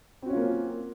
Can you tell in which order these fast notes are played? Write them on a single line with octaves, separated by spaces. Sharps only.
C4 F#4 C#4 F4 A#3